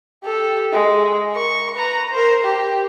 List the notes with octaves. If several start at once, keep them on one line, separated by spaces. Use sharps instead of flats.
G4 A4
G#3
A#4 C#6
B4 A#5
A#4 C5
G4